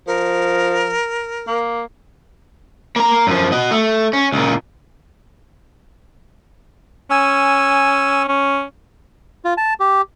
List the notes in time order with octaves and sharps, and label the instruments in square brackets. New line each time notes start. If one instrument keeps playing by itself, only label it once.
[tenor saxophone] F3 [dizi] A#4
[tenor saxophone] A#3
[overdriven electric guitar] A#3 A#5
F#2 F3
F#4 D#5
A3
C#4
C#2 A#2
[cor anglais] C#4 [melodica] G#5 E6
[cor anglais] C#4
[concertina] F4
A5
G4